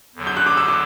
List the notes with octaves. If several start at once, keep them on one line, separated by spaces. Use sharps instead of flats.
E2 D3 F#3
G6
F#6
D6
E6
D6